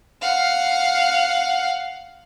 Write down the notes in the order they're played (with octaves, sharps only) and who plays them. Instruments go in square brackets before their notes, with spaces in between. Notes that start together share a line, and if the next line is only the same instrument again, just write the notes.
[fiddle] F5 F#5